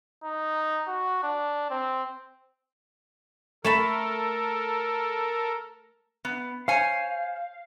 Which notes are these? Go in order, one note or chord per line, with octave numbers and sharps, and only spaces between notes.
D#4
F#4
D4
C4
A3 A4 A#4 A5 B5
B3
C5 C#5 F5 G#5